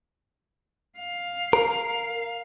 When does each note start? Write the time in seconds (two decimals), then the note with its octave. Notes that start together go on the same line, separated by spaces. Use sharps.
0.99 F5
1.53 A#4